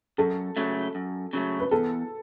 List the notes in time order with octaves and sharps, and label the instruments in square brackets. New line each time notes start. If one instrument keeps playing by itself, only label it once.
[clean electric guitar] F#2 [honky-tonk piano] A4
[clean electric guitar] C#3 F#3 A3
F#2
C#3 F#3 A3
[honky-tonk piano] B4
[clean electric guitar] E2 [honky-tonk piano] A4